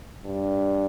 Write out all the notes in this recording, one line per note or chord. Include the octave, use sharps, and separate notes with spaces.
G2